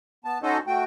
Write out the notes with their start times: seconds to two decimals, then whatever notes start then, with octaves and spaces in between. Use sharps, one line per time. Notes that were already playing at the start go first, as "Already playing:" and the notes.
0.24 B3 A5
0.43 C#4 D#4 F#4 A4 C5 D#5
0.67 A3 F#4 G5